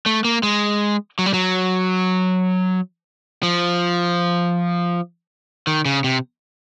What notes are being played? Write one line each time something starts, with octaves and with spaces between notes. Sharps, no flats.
A3
A#3
G#3
F#3
G3
F#3
F3
D#3
C#3
C3